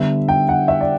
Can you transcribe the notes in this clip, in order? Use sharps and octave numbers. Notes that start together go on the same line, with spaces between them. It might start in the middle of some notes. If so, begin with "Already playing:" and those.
Already playing: D3 G3 B3 E5
G5
F#5
E5
D5